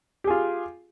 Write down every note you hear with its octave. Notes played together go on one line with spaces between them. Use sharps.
F4 G4 G#4